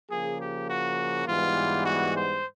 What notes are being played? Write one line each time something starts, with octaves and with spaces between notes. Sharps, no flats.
C#3 F3 A#3 G#4
G4
F#4
G#2 E3 G3 B3 F4
F#4
C5